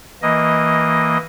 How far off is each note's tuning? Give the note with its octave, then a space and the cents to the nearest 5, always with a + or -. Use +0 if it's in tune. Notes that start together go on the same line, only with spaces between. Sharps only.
E3 -5 A#3 +0 D#5 +0